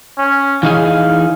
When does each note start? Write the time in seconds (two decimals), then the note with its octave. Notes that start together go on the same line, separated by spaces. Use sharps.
0.18 C#4
0.63 E3 D#4 G#4 F5